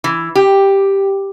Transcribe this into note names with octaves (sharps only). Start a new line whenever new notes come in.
E3
G4